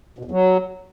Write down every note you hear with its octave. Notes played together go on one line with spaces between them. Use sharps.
B2
E2
F#3